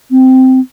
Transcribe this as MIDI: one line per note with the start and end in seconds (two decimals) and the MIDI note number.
0.11 0.60 60